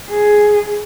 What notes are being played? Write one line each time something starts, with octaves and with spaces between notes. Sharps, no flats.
G#4